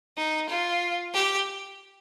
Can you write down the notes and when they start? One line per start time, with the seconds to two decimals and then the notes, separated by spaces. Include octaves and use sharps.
0.17 D#4
0.49 F4
1.14 G4